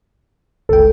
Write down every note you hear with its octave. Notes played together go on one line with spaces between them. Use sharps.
G1 C#2 A4 G5